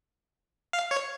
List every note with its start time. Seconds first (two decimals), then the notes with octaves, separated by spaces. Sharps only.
0.73 F5
0.91 C#5